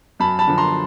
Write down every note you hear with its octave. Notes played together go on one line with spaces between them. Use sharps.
F#2 A5 B5
A5 B5
D3 F3
A#5 C6